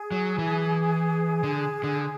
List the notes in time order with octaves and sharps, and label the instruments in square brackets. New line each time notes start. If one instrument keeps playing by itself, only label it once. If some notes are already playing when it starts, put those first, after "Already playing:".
Already playing: [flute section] G#4
[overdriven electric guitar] F#3
E3
D3
D3